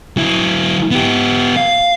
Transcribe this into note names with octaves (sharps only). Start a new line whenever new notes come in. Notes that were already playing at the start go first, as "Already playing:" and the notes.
F#3 E4
B3 G4
F5